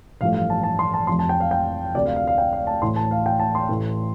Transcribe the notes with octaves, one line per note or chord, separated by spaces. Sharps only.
A1 G2 F3 A3 F5
F5
A5
A5
C6
A5
F1 F2 C3 F3 C6
A5
G5
F5
G5
D2 C3 A3 D5
F5
F5
F5
G5
F5
A5
A1 A2 A3 C6
A5
F5
G5
A5
C6
A1 A2 A3